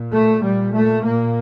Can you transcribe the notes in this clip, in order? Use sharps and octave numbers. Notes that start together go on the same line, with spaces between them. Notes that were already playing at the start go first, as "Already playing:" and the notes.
Already playing: A#2
A3
A#2 G3
A3
A#2 A#3